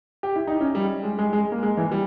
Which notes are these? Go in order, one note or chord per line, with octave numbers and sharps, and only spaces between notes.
G4
E4
D#4
C#4
G3
G#3
G#3
G#3
A#3
G#3
E3
G3